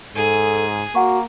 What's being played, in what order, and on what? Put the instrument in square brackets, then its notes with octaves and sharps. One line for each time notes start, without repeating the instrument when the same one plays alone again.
[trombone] G#2 [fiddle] G#4 [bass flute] A4
[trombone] A#3 [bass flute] F#4 [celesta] F#5 C#6